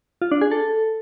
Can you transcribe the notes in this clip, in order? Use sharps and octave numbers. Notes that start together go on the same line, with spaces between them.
F4
D4
G#4
A4